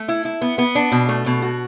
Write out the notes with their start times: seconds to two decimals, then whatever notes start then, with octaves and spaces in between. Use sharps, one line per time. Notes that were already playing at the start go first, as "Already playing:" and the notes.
Already playing: A3
0.08 E4
0.25 E4
0.41 B3
0.58 B3
0.75 D4
0.92 B2
1.09 A3
1.26 B2
1.42 F#4